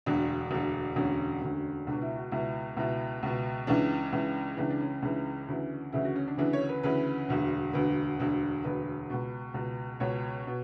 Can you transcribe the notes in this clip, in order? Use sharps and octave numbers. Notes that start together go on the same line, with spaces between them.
E1 D2 D3 D4
E1 D2 D3
E1 D2 D3 C#4
E1 D2 D3
C#2 B2 D4
E4
F#4
C#2 B2 E4
C#2 B2 E4
C#2 B2
C#2 C#3 E3 D4
C#2 C#3 E3
C#2 C#3 E3 D4
D4
C#4
C#2 C#3 E3 D4
D2 C#3 E3
D2 C#3 E3 E4
F#4
C#4
D4
D2 C#3 E3 D4
C#5
B4
D2 C#3 E3 B4
E1 D2 D3
E1 D2 D3 B4
E1 D2 D3
E1 D2 D3 B4
C#2 B2
C#2 B2
C#2 B2 C#5
B2